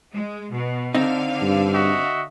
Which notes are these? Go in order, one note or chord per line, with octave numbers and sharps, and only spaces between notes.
G#3
B2
D3 C4 D#4 F5
G2
F#4 D#5 E5